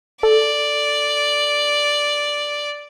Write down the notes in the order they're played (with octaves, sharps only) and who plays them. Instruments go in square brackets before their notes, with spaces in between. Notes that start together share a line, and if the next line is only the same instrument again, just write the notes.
[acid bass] A4 [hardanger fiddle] D5